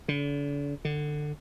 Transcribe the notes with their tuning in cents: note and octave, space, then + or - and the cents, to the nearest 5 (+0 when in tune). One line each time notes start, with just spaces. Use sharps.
D3 -40
D3 +20